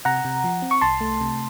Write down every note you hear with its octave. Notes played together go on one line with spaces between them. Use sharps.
C3 F#5 A#5
C3
F3
C4
C#6
C2 A5 C6
A3
C3